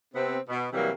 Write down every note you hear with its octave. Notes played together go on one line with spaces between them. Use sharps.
C3 B3 C4
B2
C3 E3 F#3 G3 A#3